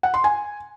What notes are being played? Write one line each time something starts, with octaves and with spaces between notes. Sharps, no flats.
F#5
C6
G#5